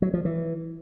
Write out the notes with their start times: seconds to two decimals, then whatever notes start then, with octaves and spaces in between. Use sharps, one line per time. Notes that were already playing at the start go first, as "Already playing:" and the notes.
0.02 F#3
0.14 F3
0.25 E3